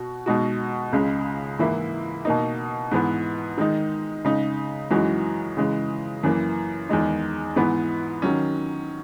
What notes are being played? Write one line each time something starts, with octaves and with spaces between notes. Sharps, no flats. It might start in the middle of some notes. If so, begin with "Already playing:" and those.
Already playing: B2 F#4
B2 G#3 D#4 F#4
C#2 C#3 G#3
G#2 E3 A#3 E4
B2 A#3 D#4
G#2 E3 B3
D#3 G#3 D#4
C#3 G#3 D#4
F#2 E3 G#3 D#4 F#4
C#3 E3 G#3
F#2 E3 A#3
E2 D#3 G#3 D#4
G#2 E3 B3
D#3 F#3 C#4